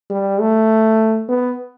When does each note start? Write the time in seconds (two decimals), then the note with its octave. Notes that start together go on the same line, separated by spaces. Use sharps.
0.10 G3
0.40 A3
1.29 B3